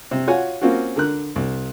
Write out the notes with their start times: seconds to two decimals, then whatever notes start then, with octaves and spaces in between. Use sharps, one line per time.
0.11 C3
0.27 F4 F#4 C#5 F#5 G#5
0.61 A#3 C4 C#4 F4 F#4
0.96 D3 A#4 F#6
1.36 C2